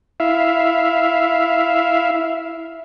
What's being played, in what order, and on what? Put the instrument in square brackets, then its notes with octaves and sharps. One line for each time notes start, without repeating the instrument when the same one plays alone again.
[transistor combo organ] E4 E5 F5